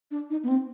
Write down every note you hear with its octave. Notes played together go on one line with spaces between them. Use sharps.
D4
D#4
B3
C4